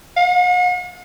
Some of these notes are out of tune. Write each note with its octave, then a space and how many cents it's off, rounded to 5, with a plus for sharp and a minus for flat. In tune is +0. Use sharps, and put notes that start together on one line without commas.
F#5 -45